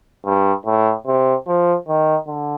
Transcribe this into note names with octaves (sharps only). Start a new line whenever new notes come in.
G2
A2
C3
F3
D#3
D3